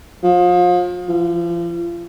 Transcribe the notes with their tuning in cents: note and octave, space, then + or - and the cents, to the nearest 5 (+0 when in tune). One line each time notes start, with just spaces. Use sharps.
F3 +35
F3 -35